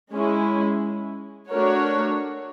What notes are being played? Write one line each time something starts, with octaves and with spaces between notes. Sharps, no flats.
G#3 C#4 E4
A3 D4 F#4 A#4 C#5